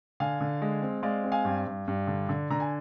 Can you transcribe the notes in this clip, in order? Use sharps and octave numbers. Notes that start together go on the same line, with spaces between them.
D3 F5 G#5
D3
G#3
C4
G#3 D5 F5
C4
F5 G#5
G2
G2
G2
D3
D3
D3 A#5
G#5